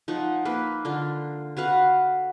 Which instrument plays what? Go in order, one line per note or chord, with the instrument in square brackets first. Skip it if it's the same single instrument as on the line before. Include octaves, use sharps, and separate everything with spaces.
[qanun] F3 D#4 F#5 C#6
A#3 B4
D3 F4
F#4 B4 F5 F#5